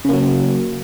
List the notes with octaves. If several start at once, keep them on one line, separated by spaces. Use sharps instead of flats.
C#3 F#3 A#3